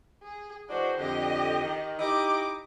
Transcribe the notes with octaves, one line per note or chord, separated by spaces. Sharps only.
G#4
E3 G#3 D4 F#4 C5
F2 D3 G4 D#5
D#3
D#4 E4 G4 D#5 D6